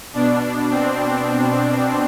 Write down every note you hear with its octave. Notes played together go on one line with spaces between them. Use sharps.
B2 D4
C4